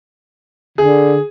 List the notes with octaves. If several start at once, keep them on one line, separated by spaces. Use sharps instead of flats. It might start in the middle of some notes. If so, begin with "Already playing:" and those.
D3 G#4